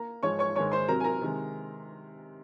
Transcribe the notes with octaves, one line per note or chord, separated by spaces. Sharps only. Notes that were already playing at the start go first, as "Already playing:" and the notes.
Already playing: A#3 A#5
G#2 F3 G#3 C#5 C#6
C#5 C#6
G#2 D#3 G#3 C#5 C#6
C5 C6
C3 F#3 C4 A#4 A#5
G#5
A#4 A#5
C3 D#3 G#3